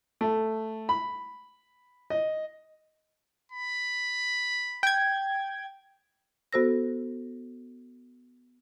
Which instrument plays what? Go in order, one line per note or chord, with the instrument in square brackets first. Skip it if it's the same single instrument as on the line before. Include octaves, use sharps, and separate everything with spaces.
[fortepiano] A3
B5
D#5
[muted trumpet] B5
[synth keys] G5 G#6
[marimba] B3 F#4 A4 C5 E6 A#6